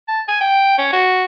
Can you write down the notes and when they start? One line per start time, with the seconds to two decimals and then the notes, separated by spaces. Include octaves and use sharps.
0.08 A5
0.28 G#5
0.41 G5
0.78 C#4
0.93 F#4